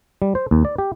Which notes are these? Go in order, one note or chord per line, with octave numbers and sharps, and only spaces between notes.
G3
C5
D#2
D5
G4